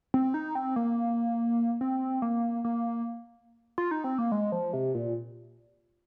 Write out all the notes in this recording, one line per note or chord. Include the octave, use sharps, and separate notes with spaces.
C4
D#4
C4
A#3
C4
A#3
A#3
F4
D#4
C4
A#3
G#3
F3
C3
A#2